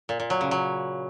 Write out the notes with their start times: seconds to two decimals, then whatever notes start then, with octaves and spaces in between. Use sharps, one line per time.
0.09 A#2
0.20 A#2
0.30 F#3
0.41 C#3
0.51 F#3